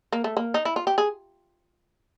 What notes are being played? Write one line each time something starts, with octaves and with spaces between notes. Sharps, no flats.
A#3
A3
A#3
D#4
E4
F4
G4
G#4